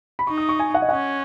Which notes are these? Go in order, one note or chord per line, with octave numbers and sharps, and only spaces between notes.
B5
D#4 C#6
D#6
C#6
G#5
F#5
D#5
C#4 F#5